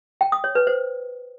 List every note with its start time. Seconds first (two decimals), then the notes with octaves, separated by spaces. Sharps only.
0.21 G5
0.32 D#6
0.44 C#5
0.55 B4
0.67 C5